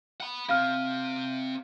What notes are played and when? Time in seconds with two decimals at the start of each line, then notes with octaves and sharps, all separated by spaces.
0.20 F#5 B5
0.49 C4 G4 F5 F6